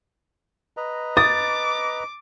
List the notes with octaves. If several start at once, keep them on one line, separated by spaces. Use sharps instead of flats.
B4 D#5 A#5
D6 D#6 A6